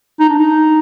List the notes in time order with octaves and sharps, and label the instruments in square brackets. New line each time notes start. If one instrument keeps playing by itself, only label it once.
[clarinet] D#4
D4
D#4